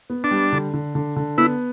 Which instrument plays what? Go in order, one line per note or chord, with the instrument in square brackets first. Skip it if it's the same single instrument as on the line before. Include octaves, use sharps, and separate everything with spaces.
[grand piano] B3
[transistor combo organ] D4
[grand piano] G3
D3
D3
D3
D3
[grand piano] B3 [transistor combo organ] E4